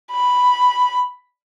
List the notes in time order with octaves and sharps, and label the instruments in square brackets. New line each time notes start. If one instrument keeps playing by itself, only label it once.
[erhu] B5